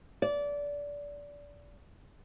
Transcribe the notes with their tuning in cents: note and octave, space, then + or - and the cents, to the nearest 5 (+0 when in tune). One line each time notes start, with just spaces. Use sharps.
D5 -20